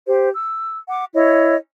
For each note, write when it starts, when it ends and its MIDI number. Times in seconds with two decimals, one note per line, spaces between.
0.07 0.30 67
0.07 0.30 72
0.34 0.77 88
0.90 1.05 78
0.90 1.05 86
1.13 1.56 64
1.13 1.56 73
1.13 1.56 75